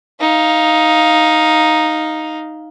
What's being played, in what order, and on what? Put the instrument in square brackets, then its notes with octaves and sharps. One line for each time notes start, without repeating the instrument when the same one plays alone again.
[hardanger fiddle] D#4 F5